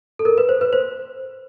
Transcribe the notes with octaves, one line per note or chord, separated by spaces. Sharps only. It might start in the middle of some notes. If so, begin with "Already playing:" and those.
A4
A#4
B4
C5
B4
C5